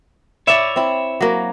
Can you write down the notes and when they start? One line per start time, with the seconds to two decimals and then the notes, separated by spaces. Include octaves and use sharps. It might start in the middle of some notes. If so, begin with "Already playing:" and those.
0.47 E4 C#5 D5 E5
0.76 C4 E4
1.21 F#3 A#3